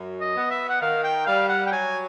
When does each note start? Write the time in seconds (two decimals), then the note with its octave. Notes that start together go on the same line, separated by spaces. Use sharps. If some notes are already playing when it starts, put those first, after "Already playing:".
Already playing: F#2
0.20 D#5
0.36 B3
0.51 E5
0.69 F#5
0.81 D#3 F5
1.04 G5
1.26 G3 F5
1.49 F#5
1.66 G5
1.71 F#3 G#5